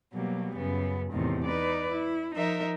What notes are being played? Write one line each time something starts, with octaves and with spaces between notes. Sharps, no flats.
B2 F#3 G3 A#3
F#2 C#3 B3
E2 A2 C3 D#3
D#4 B4 D5
E4
F3 D#4 A#4 E5